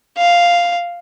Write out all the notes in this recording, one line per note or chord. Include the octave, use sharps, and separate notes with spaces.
F5